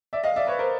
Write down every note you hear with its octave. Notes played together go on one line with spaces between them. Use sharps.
D5 E5
D#5 F5
D5 E5
B4 C#5
A#4 C5